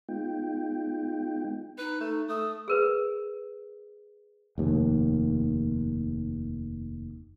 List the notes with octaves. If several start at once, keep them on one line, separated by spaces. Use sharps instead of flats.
G#3 B3 D#4 F4 G5
D#4 B4
A3
A3 D#6
G#4 A#4 B4
F1 D#2